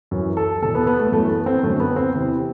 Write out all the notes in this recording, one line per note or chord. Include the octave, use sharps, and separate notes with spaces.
F#2 E3
A4
E2 B2 A4
B3
B3
A3
F#2 E3 A3
B3
C4
F#2 D3 A3
B3
C4
E2 C3 E3